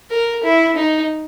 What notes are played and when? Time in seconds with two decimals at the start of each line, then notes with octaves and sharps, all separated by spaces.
0.11 A#4
0.44 E4
0.77 D#4